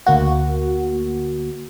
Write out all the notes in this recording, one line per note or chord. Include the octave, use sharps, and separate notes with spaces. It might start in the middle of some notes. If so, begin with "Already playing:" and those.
D2 A#3 F#4